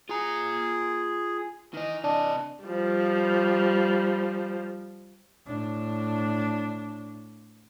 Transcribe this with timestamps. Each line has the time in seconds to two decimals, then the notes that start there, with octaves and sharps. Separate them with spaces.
0.09 F4 G#4 A#5
1.74 D#3 E3 D#5
2.04 C3 D4 D#5
2.64 F3 G3
5.46 A2 D4